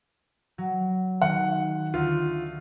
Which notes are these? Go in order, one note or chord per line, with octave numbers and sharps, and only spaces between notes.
F#3
D#3 F#5
D2 F4